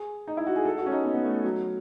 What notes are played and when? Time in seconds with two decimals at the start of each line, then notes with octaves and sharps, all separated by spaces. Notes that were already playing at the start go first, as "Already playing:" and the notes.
Already playing: G#4
0.27 D#4
0.37 E4
0.47 F#4
0.56 G#4
0.65 A4
0.78 F#4
0.86 C#4
0.92 D#4
1.04 B3
1.14 B3
1.25 A3
1.44 F#3